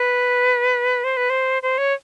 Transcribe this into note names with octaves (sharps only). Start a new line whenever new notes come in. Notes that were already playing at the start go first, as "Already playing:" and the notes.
Already playing: B4
C5
B4
C5
C5
C#5